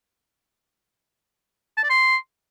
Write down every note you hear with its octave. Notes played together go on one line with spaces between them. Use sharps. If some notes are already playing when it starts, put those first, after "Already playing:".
A5
D5
C6